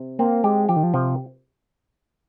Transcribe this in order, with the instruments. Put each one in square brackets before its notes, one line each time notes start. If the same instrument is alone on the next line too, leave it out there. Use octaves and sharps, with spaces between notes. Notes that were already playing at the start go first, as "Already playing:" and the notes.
Already playing: [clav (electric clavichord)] C3
[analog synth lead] A#3 [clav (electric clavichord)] C4
[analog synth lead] G#3 [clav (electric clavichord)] G4
[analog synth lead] F3 [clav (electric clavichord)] G4
[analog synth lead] D#3
F3
[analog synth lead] C3 [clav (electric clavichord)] F3